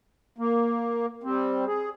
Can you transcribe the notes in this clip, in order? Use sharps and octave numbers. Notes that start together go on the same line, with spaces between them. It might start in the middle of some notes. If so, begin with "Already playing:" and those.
A#3
G3 C4
G#4